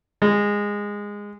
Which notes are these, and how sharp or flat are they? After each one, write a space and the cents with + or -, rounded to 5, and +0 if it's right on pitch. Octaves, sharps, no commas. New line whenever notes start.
G#3 -15